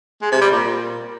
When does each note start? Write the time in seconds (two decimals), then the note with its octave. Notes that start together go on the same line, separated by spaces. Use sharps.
0.22 G#3
0.31 C3
0.41 G3
0.51 A#2